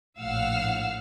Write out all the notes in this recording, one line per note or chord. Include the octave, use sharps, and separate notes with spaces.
A#1 A2 F5 F#5 E6 F6